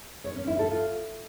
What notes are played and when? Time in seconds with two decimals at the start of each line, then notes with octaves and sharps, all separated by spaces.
0.24 C#5
0.36 C#4
0.47 E4
0.59 A4
0.70 F4